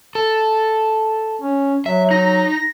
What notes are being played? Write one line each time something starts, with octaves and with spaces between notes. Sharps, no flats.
A4
C#4
F#3 E5
D#4 A#6